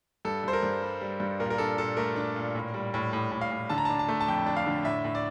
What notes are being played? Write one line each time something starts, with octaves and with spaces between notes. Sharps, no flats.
G2 A4
G2 C5
A#4
G2
G3
G3
G2
A#2 A#4
A#4
D4 A4
A#2 A4
A3 A#4
D4
A#2
A2
G3
A2
A2
A2
F5
A2
D3 A5
A#5
D4 A5
A5
A3
A5
F2 G5
D4
F5
D3
A2 E5
A2
D5